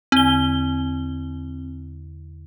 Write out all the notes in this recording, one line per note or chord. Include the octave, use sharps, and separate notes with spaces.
E2 D3 C4 G7